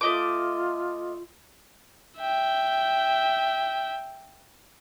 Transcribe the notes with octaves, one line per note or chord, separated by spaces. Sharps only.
A3 F4 D#5 D6
E5 G5